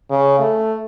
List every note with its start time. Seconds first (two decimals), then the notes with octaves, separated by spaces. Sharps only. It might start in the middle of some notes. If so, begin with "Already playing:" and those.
0.10 C#3
0.40 A3